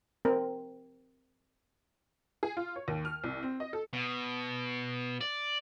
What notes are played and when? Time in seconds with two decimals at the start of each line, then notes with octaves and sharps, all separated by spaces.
0.25 C4 A#4
2.43 G#4
2.57 F4
2.76 C#5
2.88 D#2
3.05 F6
3.24 C2
3.43 C4
3.60 D#5
3.73 A4
3.93 B2
5.21 D5